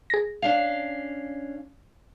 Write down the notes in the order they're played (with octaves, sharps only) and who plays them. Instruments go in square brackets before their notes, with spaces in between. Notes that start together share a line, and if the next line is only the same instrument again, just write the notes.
[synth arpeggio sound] G#4 A#6
[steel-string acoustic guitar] C#4 D4 F5